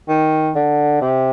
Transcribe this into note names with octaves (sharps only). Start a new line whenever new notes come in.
D#3
D3
C3